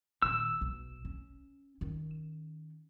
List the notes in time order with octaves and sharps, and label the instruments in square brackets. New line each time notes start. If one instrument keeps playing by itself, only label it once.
[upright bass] A#2 D#3 [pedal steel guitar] E6
[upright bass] B1
C#4
D#3 C#4